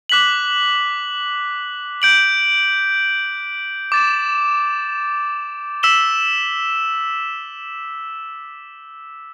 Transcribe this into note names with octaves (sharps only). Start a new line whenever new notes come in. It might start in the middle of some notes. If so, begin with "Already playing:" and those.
D6 F#6 B6 F#7
G6 D7 F#7
D6 A6 E7
E6 B6 E7 G7